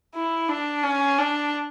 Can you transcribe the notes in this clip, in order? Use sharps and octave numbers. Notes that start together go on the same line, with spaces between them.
E4
D4
C#4
D4